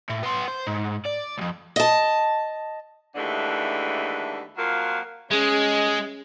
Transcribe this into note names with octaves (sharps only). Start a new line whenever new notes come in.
A2
B3 C6
C5
G#2
D5
C2 F2
D#5 A5
D#2 D3 E3 G#3 A3 D4
F2 F#3 A#3 F4 F5
G#3 C#4 G#4